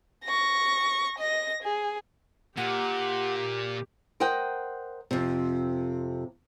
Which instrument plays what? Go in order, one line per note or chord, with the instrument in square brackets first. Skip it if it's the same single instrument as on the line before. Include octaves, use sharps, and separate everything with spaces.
[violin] C#6 A#6
D#5 A#6
G#4
[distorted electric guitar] A#2 [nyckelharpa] G4 [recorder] F#5
[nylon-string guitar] A#4 C5 D#5 F#5 G5
F2 C3